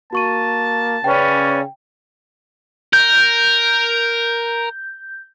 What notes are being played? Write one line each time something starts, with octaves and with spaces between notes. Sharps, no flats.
A#3 F#4 A5 C#6 D#7
C#3 C#4 B4 D5 G5
A#4 G6